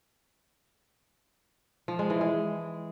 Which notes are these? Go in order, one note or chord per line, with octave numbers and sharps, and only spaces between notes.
F3
G#3
E3
G#3